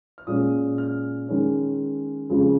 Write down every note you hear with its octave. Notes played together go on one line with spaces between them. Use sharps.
F6
A#2 G#3 C#4 D#6
F6
D#3 G#3 C#4
F2 C#3 F3 G#3